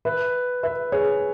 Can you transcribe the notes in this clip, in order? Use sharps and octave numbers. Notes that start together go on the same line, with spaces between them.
B4 E5
B4 E5
G#4 C#5